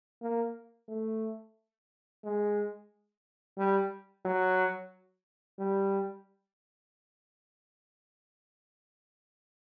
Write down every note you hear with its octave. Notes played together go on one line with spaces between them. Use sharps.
A#3
A3
G#3
G3
F#3
G3